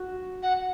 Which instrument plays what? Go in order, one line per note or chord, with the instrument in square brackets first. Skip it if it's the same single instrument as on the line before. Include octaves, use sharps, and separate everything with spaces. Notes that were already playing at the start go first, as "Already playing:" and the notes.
Already playing: [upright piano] F#4
[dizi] F#5